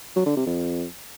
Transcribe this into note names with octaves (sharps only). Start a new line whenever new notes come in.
F#3
D3
C3
F2